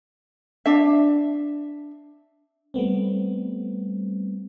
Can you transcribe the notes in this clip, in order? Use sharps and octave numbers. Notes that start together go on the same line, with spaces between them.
D4 E5
G3 A3 B3 C4